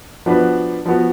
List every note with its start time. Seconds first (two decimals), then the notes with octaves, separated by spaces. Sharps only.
0.26 F3 B3 D4 F#4 B4
0.86 F3 B3 F#4